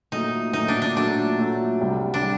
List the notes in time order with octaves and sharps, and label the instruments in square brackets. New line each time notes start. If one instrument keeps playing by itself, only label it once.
[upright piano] A#2 F#3 A3 [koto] D#4
[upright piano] A#2 F#3 A3 [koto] D#4
[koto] D4
D4
[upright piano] A#2 F#3 A3 [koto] D4
[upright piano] A#2 F#3 A3
C2 C3 G3
[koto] D4
[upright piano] G3